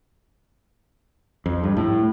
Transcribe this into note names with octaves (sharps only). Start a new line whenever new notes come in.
F2
G2
A2